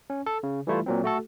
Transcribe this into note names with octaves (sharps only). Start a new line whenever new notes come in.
C#4
A4
C#3
E3 G3 A3 E4 F4
A#2 F#3 C4
A3 F#4 A4